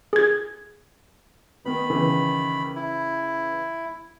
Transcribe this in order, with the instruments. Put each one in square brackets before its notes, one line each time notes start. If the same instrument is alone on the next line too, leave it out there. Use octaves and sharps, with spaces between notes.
[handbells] G#4 G#6
[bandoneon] D#3 B5 [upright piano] B3
[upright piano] C#3 E3
[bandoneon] E4